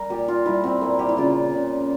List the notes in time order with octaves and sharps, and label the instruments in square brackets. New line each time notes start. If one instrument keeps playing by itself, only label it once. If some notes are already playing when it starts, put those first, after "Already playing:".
Already playing: [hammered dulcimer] G3 A#4
A#2 G4
F4
G3 E4
C4
A#2 A#3
G4
E4
C#3 F4
C#3